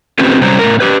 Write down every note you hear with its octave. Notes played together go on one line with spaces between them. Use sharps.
A3 C4 C#4 F4 G4 B4
C3 F#3 G3 C#4 C5 A#5
A2 A#4
G4 B4